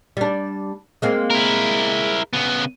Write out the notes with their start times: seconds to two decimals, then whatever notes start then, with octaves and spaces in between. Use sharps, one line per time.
0.17 G3 D4
1.02 G#3 A#3 C4
1.30 E4 A#4
2.33 C#3 B3